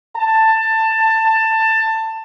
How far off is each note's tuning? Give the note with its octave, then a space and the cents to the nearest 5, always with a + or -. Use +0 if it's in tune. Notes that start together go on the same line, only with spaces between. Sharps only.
A5 +15